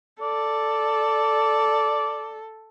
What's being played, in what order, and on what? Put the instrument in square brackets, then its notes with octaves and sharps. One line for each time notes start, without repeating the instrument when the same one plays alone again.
[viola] A4 [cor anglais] D5